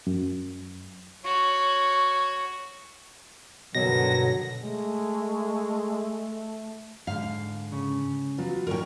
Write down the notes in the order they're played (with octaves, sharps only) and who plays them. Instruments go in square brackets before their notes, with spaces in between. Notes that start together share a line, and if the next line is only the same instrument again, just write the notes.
[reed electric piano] F#2
[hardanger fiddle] F#4 C#5
[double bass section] G2 D3 D#3 [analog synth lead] B2 [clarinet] F#3 [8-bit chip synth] A#6
[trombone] G#3 [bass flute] A3
[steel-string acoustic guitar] G#2 D3 [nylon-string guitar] F5
[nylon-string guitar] C#3
[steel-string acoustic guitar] F#3 B3 F4
[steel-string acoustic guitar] A2 D3 [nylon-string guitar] A#4 C#5 G5